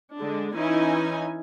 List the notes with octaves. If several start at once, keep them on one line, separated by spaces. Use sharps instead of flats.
D3 G#3 D4
E3 C#4 D#4 E4 G#5